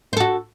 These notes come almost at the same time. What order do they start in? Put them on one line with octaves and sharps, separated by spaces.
C5 A4 F#4